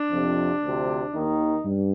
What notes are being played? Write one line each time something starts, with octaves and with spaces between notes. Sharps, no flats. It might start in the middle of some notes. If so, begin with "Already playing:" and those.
Already playing: D4
F2 C3 F3
D2 C3 F3
D#2 D#3 D#4
G2